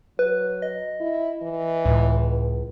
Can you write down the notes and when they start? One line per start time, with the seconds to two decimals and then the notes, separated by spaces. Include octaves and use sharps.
0.19 F#3 B4
0.62 D#5
1.00 E4
1.43 E3
1.85 C#2 A2